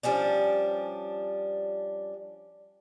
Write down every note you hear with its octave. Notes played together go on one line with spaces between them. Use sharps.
F3 G3 C#4 D4